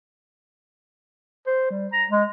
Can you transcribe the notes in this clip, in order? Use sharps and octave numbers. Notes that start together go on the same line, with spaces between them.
C5
G3
A#5
G#3